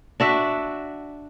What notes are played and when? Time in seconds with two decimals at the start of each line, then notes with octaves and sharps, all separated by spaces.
0.20 D4 F#4 E5